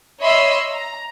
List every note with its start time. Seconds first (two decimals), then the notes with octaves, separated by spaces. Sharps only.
0.21 C#5 D#5 E5 B5 C6 E6
0.72 A#5